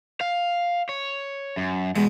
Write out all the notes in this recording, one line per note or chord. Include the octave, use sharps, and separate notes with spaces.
F5
C#5
F#2
E2 B2 G#3